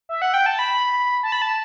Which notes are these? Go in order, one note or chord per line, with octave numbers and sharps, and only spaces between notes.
E5
F#5
G5
A5
B5
A5
B5
A5